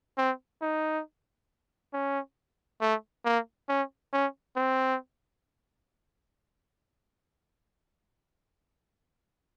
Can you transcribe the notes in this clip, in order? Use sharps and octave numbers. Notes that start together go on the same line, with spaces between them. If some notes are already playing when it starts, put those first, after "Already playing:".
C4
D#4
C#4
A3
A#3
C#4
C#4
C4